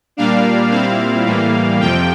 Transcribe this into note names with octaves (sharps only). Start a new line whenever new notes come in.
A#2 G3 A#3 D4 F5
A#2 G3 C4 E4 F5
A2 E3 G3 A#3
F2 C3 F3 G5